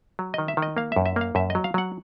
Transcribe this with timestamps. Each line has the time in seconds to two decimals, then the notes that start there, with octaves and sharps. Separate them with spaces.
0.19 F#3
0.34 D#3 D#5
0.48 E5
0.57 D#3
0.62 D#5
0.77 A#3 F5
0.92 F#2 E5
1.06 E5
1.16 A#3 F5
1.35 F#2 E5
1.50 F#3 D#5
1.64 F5
1.74 F#3 F#5